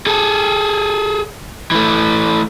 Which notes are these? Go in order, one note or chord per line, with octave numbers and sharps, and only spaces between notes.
G#4 A4
E3 A3